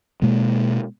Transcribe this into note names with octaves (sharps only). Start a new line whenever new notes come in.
B2 G#3 A#3